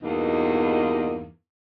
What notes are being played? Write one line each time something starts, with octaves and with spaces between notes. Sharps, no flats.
E2 G2 B2 A#3 D#4